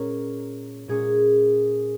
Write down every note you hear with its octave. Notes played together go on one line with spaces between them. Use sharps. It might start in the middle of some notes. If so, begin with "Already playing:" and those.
Already playing: A#2 G#3 C#4 A#4 C#5
A#2 G#3 C#4 G#4